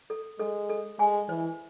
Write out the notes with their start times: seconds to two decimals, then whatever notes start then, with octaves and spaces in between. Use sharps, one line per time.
0.10 A4
0.40 G#3 A4
0.70 A4
0.99 G#3 G#5
1.29 E3 C5